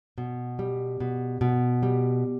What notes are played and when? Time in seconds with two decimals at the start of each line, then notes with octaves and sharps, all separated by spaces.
0.18 B2
0.59 G3
1.00 B2
1.41 B2
1.83 G3